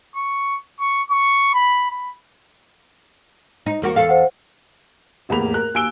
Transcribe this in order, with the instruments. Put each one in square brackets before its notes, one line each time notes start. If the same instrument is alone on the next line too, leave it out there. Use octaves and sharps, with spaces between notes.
[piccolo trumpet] C#6
C#6
C#6
B5
B5
[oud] D#4
E2 A#3 F#4
E2 A4 F5
[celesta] C5 F#5
[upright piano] F1 E2 A2 A#3 B5 F7
A#4 F#6
D#2 G#5 E6 D7 G7